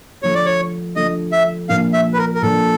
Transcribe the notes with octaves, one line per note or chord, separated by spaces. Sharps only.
D3 F3 A3 C#5
D5
C#5
D3 F3 A3 D#5
E5
A#2 F3 A#3 D4 F5
E5
B4
A#4
A#4
A#2 F3 A#3 D4 A4